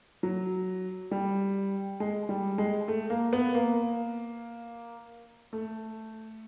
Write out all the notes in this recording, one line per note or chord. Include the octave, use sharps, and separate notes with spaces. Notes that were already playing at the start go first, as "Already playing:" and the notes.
F#3
G3
G#3
G3
G#3
A3
A#3
B3
A#3
A3